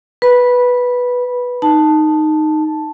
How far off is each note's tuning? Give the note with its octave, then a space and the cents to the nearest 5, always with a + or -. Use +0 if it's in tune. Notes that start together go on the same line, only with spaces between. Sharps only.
B4 -5 B5 -15
D#4 -5 A5 +0